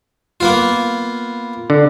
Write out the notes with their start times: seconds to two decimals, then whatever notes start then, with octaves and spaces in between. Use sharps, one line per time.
0.40 A#3 B3 F4
1.70 D3